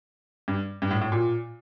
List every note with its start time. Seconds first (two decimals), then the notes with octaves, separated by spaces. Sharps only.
0.48 G2
0.82 G2
0.91 A2
1.01 A2
1.12 A#2